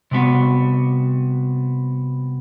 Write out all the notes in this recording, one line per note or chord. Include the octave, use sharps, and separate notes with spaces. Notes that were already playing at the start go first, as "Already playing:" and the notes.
C3 G3 B3 F#4